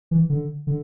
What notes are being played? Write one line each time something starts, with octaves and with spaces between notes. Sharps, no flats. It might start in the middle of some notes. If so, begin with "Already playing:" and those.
E3
D3
D3